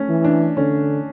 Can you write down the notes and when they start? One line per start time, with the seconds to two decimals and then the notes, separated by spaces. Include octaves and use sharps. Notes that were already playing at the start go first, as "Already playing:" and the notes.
Already playing: A3 C#4
0.09 E3
0.24 D4
0.57 D3 C#4